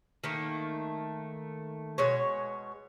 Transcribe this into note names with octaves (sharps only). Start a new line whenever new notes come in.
D#3 A3 A#3
B2 G#3 C#5